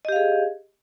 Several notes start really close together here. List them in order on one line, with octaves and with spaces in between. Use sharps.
D#5 G4 F5 G#4